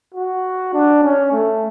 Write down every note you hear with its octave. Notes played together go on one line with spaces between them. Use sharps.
F#4
D4
C#4
A3